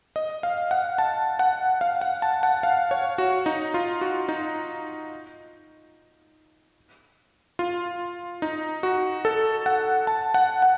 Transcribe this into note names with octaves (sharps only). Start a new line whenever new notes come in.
D#5
F5
F#5
A5
F#5
F5
F#5
A5
F#5
F5
C#5
F#4
D#4
F4
F#4
D#4
F4
D#4
F#4
A4
F#5
A5
F#5
F#5